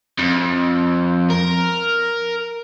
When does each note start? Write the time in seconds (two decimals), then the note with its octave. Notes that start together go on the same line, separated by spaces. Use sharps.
0.19 F2
1.30 A#4